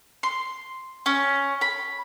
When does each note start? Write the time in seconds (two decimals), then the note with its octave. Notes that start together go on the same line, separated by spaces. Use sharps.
0.23 C6
1.06 C#4
1.61 B5